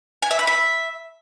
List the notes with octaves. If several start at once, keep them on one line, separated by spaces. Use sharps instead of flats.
G#5
E5
B5
E5